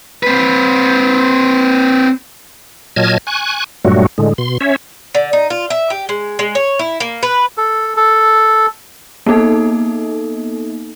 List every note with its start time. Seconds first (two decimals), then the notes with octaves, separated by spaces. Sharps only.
0.23 C4 B4
2.96 A#2 F#3 D#5 A5 F6 G#6
3.27 G#5 C#6 F#6
3.85 G2 A#2 F#3 G3 A3 F#4
4.18 A2 D3 G#3
4.38 B2 C6
4.61 C#4 C#5 E5
5.15 D3
5.33 D#4
5.50 F4
5.70 E5
5.90 G4
6.09 G#3
6.39 G#3
6.55 C#5
6.79 E4
7.00 A#3
7.23 B4
7.57 A4
7.97 A4
9.26 A#3 B3 D#4 A4